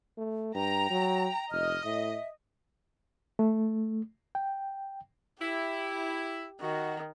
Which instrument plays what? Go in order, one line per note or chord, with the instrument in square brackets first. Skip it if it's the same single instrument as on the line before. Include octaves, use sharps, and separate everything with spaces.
[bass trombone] A3
[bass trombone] G2 [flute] G5 [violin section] A#5
[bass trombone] F#3
[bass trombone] F1 [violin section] D#5 [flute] F6
[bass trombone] A2 [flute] E5
[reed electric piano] A3
G5
[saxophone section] E4 [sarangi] G4
[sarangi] D#3 [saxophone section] F#4